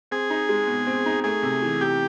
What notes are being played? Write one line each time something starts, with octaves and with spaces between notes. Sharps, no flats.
C4 G#4
D#4
G#3
B2
C4
D#4
A3 G#4
C3
E3
C3 G4